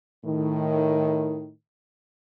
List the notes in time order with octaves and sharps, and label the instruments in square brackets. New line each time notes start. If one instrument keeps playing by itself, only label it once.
[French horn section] A2 D#3